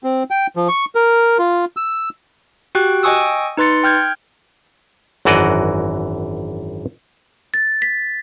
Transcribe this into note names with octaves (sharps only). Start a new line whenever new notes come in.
C4
G5
F3
C#6
A#4
F4
E6
F#4 G4 G5 C#6 F#6
D#5 G5 G#5 C#6 D#6 E6
D#4 B4 C6 A6 C#7
G5 F6 G6 G#6
G#1 F#2 E3 F#4 D5 D#5
A6
B6